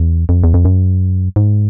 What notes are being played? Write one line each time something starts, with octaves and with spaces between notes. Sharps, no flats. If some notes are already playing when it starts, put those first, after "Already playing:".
Already playing: E2
F2
E2
F2
F#2
G#2